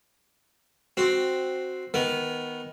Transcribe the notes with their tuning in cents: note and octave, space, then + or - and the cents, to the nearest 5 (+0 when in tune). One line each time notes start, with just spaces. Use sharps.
C4 +0 F#4 +0
D#3 +5 B3 -5